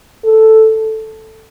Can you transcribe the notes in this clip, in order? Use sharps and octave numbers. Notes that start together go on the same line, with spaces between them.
A4